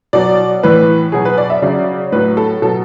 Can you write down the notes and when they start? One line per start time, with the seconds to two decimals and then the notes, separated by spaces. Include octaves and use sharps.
0.13 B2 F#3 D5
0.63 A2 E3 B4
1.12 B2 F#3 G#4
1.25 B4
1.38 D5
1.50 E5
1.62 C#3 F#3 D5
2.12 A2 F#3 B4
2.37 A4
2.62 B2 F#3 A4